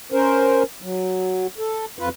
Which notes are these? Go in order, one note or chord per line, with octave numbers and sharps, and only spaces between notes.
C#4 A#4 C5
F#3
A4
F2 F4 B4